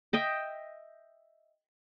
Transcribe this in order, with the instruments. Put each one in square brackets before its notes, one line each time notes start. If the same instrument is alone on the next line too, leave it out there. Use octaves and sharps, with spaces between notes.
[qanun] D#5 E5 G5